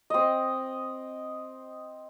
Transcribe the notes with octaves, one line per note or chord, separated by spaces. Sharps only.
C4 D#5